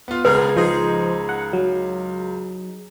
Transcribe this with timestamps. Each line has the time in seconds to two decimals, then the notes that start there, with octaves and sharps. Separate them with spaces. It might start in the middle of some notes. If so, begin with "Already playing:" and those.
0.08 B3 F4
0.25 C#2 B2 G#4 A#4 B4 F6
0.56 F3 D#4 G#4 C5 D#5
1.29 F#5
1.53 F#3